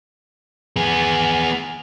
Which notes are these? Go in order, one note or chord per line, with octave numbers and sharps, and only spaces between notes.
B3 G#4